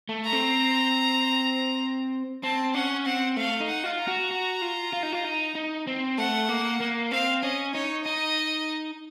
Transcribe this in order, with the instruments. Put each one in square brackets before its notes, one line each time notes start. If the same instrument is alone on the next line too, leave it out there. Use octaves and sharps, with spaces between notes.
[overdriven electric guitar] A3
[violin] A#5
[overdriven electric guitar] C4
[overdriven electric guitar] C4 [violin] A5
[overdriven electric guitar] C#4 [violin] F#5
[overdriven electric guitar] C4 [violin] F#5
[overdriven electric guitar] A3 [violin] F5
[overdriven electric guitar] D#4
[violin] F#5
[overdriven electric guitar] F4
[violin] A#5
[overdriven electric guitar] F#4
F#4
F4
F4
D#4
F4
D#4
D#4
C4
[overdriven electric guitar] A3 [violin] F#5
[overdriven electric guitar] A#3
A#3
[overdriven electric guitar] C4 [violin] F5
[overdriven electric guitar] C#4 [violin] D#5
[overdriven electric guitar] D#4 [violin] C#5
[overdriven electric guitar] D#4 [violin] D#5